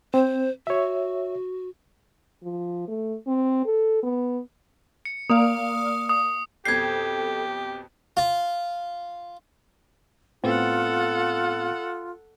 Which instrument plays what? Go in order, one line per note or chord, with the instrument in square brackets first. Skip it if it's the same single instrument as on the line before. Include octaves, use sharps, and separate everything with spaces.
[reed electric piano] C4 [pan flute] C5
[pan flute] F#4 [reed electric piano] C#5 E5
[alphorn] F3
A3
C4
A4
B3
[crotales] C#7
[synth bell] A#3 D5 F5 [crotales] D#6
[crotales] D#6
[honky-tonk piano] F2 B2 G6 [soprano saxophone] G4 [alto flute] A4 [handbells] G#6 C7
[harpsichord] F4
[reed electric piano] A2 B3 C4 [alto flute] F4 [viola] A4 F#5